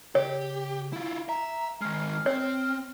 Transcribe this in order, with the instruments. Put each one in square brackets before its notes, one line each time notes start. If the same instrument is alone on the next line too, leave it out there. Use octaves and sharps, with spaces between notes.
[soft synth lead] C#3 [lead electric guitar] G4 [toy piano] C#5
[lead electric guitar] E4 F4
[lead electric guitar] E5 [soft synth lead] A#5
[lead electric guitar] D#3 G#3 [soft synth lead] F6
[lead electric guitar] C4 [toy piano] C#5